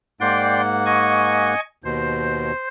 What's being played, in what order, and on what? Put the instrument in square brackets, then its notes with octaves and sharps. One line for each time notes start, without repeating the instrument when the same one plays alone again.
[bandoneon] G#2 A#3 F#5 [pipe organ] D5 G5 C6
[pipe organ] D#5 G#5 C#6
[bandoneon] D#2 B2 [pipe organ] C5